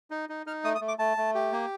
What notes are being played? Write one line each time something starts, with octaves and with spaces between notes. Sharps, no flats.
D#4
D#4
D#4 F6
A3 D#6
D#6
A3
D6
A3 A5
A3
G4
A#3